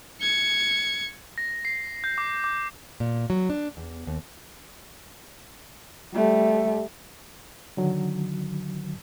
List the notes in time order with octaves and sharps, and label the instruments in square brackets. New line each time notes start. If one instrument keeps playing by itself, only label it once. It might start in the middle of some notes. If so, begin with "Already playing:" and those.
[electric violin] G#6 C#7
[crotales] A#6
C7
G6
D6
D6
[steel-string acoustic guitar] A#2
F#3
D4
E2
D#2
[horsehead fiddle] G3 A3
[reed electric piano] D3 D#3 F#3